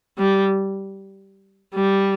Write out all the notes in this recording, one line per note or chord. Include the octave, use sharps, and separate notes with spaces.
G3
G3